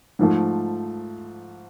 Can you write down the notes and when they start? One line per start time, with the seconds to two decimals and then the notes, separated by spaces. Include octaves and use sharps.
0.19 G#2 F3 A3